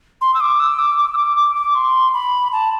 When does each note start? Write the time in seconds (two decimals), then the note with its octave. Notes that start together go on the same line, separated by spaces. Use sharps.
0.21 C6
0.34 E6
0.41 D6
0.60 E6
0.79 D6
0.98 D6
1.13 E6
1.18 D6
1.37 D6
1.56 D6
1.75 C6
2.13 B5
2.52 A5